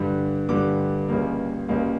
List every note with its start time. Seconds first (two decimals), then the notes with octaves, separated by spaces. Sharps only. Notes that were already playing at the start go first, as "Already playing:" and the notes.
Already playing: G2 D3 G3
0.49 G2 D3 G3 D6
1.09 C#2 C#3 G3 A#3
1.69 C#2 C#3 G3 A#3